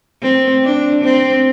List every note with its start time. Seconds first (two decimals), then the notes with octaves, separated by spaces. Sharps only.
0.22 C4
0.63 D4
1.04 C4